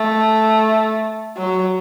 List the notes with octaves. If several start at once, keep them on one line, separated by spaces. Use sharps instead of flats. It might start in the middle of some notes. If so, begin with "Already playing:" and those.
Already playing: A3
F#3